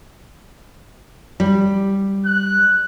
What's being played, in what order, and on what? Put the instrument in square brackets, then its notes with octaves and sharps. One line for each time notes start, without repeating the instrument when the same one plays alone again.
[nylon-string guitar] G3
[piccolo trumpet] F#6